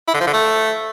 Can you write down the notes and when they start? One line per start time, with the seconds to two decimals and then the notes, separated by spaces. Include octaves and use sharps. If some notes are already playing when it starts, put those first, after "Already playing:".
0.08 E4
0.14 D3
0.21 F3
0.27 D3
0.33 A3